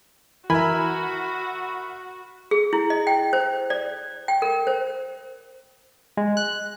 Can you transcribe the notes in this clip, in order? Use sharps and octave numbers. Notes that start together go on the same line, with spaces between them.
E3 F#4 A#4 E5 G#5 B5
G#4
E4
D#5
G5
C5
D5
G5
A#4
C5
G#3
F#6